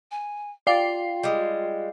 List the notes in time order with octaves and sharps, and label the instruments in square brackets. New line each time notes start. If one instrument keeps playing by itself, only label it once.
[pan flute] G#5
[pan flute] F4 [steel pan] D5 [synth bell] F5 G5 C7
[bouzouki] G3 G#3